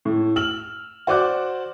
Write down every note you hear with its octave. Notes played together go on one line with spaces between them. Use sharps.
A2
E6 F6 F#7
F#4 C5 D5 D6 F#6